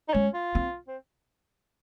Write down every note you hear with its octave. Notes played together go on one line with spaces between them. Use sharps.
D#4
G#3 C#4
F4
C4
C4